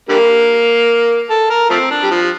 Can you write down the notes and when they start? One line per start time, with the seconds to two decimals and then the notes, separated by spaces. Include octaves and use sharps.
0.09 D3 G3 A#3
1.30 A4
1.50 A#4
1.70 F3 A3 C4
1.91 D4
2.03 G3
2.11 F3